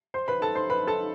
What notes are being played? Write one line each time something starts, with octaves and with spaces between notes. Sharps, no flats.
C5 C6
B4 B5
A4 A5
C5 C6
B4 B5
A4 A5